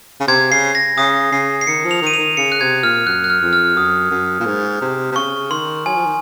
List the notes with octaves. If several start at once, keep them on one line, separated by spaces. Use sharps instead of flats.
C#3
C3 G#6
C#3 C7
A#6
C#3 D#6
C#3 C7
C7
D#3 C#7
F3
F7
D#3 D#7
F7
D#3
C#3 C#7
F#6
C3 G#6
A#2 F6
F#2 F#6
F#6
F6
F2
F6
F#2 D#6
F#2
A#2
G#2
C3
C3
C#3 C#6
D#3 C6
F#3 G#5
F3
D#3